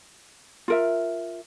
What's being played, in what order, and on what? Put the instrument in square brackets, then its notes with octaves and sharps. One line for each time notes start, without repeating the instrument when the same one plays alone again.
[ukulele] F4 A#4 E5